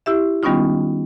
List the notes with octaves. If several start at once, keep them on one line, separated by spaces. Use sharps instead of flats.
E4 G4 E5
D#3 G3 B3 C#4 D#4 F4